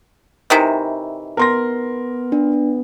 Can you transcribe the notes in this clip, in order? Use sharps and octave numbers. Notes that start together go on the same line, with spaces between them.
C3 D#3 E3
B3 A#4 C6 A#6
D4